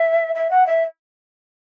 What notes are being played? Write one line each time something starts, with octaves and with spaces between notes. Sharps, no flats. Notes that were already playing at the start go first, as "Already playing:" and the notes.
Already playing: E5
E5
F#5
E5